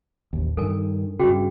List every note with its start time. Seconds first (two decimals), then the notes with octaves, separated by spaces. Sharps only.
0.33 A1 D#2
0.57 G2 D#3 A4 A#4 G#5
1.19 G2 C#3 F#4 G#4 G5